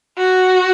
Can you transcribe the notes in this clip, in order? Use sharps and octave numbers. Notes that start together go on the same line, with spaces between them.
F#4